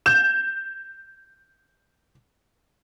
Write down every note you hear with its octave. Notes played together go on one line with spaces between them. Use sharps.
G6 E7